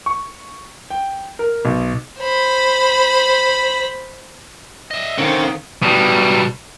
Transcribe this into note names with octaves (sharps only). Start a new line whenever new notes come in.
C#6
G5
A#4
B1
C5 B5
D#5 E5
D3 D#3 C4 C#4 F5
B2 G3